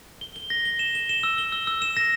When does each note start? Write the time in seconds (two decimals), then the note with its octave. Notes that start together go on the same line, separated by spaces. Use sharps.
0.21 G7
0.36 G7
0.50 A#6
0.65 G7
0.79 E7
0.95 G7
1.09 E7
1.23 E6
1.38 G7
1.52 E6
1.67 E6
1.82 E7
1.97 A#6